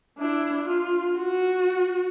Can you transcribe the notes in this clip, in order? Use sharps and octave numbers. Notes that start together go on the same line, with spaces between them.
D4 E4
F4
F#4